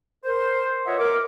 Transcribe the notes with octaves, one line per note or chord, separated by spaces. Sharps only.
A#4 C5
F4 B4 C#5 D#5 E5 F#5
A#4 D6